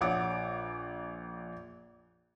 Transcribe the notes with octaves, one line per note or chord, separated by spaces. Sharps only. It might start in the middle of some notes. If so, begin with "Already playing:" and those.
A#1 C#5 F#5 D6